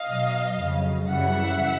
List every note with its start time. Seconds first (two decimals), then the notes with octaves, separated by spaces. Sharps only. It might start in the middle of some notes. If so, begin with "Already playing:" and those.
Already playing: D#5 F5
0.08 B2 F#3
0.59 F2 C#3 F#3
1.10 F#2 C#3 E3 G3 E5 F#5